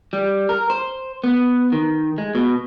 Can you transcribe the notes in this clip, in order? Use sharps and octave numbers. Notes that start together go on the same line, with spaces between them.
G3
A#4
C5
B3
D#3
G#3
B2